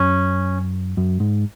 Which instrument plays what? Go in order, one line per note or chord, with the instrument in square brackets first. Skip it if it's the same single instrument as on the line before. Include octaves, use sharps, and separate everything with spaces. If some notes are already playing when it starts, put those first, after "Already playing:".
Already playing: [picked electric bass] F#2 [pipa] C#4
[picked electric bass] F#2
G#2